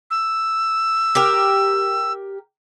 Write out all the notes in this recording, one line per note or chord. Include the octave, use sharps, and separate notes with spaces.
E6
G4 A#4